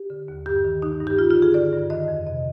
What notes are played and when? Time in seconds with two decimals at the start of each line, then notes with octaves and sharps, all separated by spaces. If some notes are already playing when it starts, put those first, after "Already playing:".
Already playing: G4
0.10 D3
0.28 D#2
0.46 G2 G4
0.65 D#3
0.82 D#3 D#4
1.00 G2
1.07 G4
1.18 G2 F4
1.31 F4
1.36 D3
1.42 G#4
1.54 D3 D5
1.72 G2
1.90 D#3 D#5
2.08 F2
2.26 C3 D#5